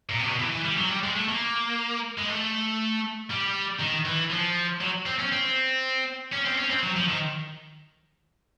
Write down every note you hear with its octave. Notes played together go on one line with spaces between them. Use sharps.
A#2
C3
B2
E3
E3
G3
F#3
G3
G#3
A3
A#3
G#3
A3
G3
D#3
E3
F3
F#3
C4
C#4
C4
C#4
C4
C#4
C4
F#3
F3
D#3